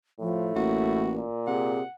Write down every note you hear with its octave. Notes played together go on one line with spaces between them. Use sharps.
A2 F3
A1 A#3 F#4
A#2
C3 G#4 F#5